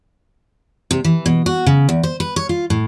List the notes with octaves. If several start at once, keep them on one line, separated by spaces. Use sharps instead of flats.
C3
E3
B2
F#4
C#3
E2
C5
B4
C#5
F4
A2